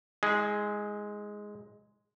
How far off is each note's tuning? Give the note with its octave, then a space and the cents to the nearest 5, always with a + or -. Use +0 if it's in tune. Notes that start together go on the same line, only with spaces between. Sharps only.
G#3 +0 E4 -45 G#4 +0